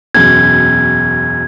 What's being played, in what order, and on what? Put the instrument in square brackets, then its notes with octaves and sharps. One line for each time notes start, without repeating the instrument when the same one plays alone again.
[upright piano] E1 F#2 [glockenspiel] G#6